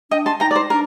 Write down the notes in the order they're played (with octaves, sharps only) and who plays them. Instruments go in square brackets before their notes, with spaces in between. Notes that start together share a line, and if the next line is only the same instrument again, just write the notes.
[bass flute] D4 [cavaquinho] D#5 G5
[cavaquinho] A5 C6
[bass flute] D#4 [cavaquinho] G5 A#5
[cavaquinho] D5
C5
[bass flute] D4 [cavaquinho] A#4